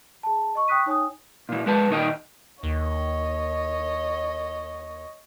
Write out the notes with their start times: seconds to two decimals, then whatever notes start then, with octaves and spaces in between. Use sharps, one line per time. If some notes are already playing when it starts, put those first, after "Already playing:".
0.23 G#4 A5
0.55 D#5 C#6
0.68 G5 C#6 D#6 F#6 B6 D#7
0.86 D#4 C#5 G5 G#5 D#6
1.49 A#2 E3
1.66 G#3 B4 A5
1.90 A#2 D#3 F#4 D#5 G5
2.63 D#2 C#5 D#5